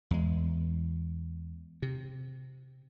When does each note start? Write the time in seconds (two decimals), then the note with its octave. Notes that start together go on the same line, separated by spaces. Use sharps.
0.11 E2 G#3
1.82 C3